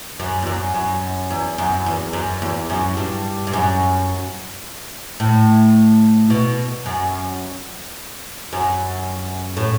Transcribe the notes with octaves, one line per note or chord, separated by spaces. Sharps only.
F#2
E2
F#2
F#2
E2
F#2
E2
F#2
E2
F#2
G2
G2
F#2
A2
B2
F#2
F#2
A2